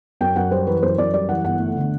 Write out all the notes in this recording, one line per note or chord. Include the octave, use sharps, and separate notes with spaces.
F#2 G5
F#2 F#5
G3 C5
E3 B4
F#2 C5
F#2 D5
G3 D5
E3 F#5
G1 F#5
A3
D3